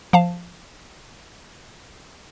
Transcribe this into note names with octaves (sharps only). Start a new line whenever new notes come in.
F3 F5 A5